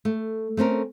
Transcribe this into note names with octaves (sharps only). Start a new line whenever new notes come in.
A3
A3 C4 C#4 A#4